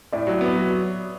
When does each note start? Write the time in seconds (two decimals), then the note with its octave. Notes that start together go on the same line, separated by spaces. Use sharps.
0.12 A2 D5 E5
0.27 F#3
0.41 B3
0.55 F#3